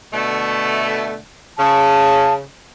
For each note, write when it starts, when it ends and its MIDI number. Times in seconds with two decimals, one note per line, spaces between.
0.13 1.17 47
0.13 1.17 50
0.13 1.17 57
1.58 2.42 49
1.58 2.34 81